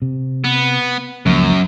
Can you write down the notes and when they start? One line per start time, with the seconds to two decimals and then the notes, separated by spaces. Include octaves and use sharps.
0.02 C3
0.44 B3
1.26 C#2 F#2 F3 A#3